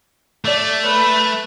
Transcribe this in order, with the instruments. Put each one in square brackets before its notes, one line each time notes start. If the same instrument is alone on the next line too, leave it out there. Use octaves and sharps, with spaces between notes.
[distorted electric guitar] A3 [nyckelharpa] D5
[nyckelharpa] B4